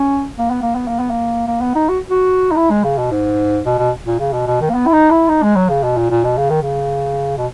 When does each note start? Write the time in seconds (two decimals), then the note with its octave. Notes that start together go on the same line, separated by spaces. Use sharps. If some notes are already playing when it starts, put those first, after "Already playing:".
Already playing: C#4
0.39 A#3
0.50 B3
0.62 A#3
0.75 B3
0.87 A#3
0.99 B3
1.10 A#3
1.48 A#3
1.61 B3
1.75 D#4
1.89 F#4
2.10 F#4
2.51 D#4
2.56 E4
2.70 G#3
2.84 C#3
2.98 B2
3.11 G#2
3.65 B2
3.78 B2
4.06 A#2
4.20 C#3
4.33 B2
4.47 B2
4.61 D#3
4.70 A#3
4.74 B3
4.86 E4
4.92 D#4
5.10 E4
5.28 D#4
5.42 G#3
5.56 F#3
5.69 C#3
5.83 B2
5.97 A#2
6.10 A#2
6.24 B2
6.38 C#3
6.50 D#3
6.62 C#3
7.37 B2